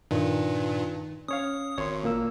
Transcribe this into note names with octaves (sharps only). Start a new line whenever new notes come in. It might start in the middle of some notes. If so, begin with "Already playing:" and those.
G2 A#2 D#3 D#4
C#4 C#5 F5 D#6
G#1 C#5 C6
A#2 A#3 E6